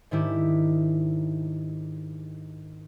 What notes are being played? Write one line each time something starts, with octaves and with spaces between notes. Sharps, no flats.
G#2 D#3 D4 E4 G4